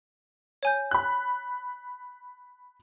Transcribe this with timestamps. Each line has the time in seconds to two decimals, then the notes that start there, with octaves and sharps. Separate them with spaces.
0.63 C#5 G#5 G6
0.91 B5 F#6